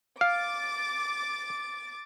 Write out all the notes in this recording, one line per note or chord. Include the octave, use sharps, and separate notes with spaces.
F5 D6 A6